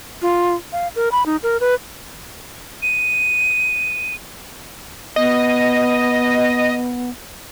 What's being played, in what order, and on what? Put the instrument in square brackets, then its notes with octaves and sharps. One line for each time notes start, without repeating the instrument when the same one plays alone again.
[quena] F4
F5
A#4
B5
D#4
A#4
B4
[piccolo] D#7
[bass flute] B3 [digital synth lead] D#5